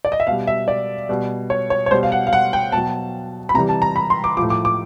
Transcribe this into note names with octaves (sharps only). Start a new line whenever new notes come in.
D5
D#5
E5
B2 G3 F5
E5
D5
B2 G3
C#5
C#5
C#5
B2 G3 C5
F5
F#5
F5
F#5
G5
B2 F#3 A5
B5
C3 E3 G3 A#5
A5
A#5
B5
C6
D6
A2 F3 D6
D6
D6